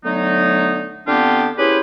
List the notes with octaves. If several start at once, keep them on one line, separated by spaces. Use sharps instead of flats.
D3 F#3 A3 B3 D#4
D3 B3 C4 D4 F4 G4
C#4 E4 G4 G#4 B4 C5